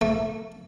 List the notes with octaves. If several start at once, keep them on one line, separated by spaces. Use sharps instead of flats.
A3